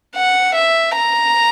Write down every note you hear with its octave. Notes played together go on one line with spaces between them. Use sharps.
F#5
E5
A#5